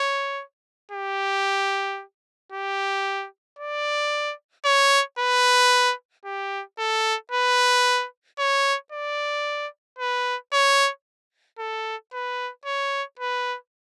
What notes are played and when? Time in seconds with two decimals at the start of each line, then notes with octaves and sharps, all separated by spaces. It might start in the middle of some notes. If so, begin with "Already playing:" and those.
Already playing: C#5
0.91 G4
2.52 G4
3.59 D5
4.65 C#5
5.19 B4
6.25 G4
6.78 A4
7.32 B4
8.39 C#5
8.92 D5
9.99 B4
10.53 C#5
11.59 A4
12.13 B4
12.66 C#5
13.19 B4